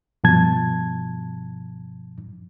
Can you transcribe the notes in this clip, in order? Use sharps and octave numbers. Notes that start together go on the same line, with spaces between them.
G2 B2 F3 A5 G#6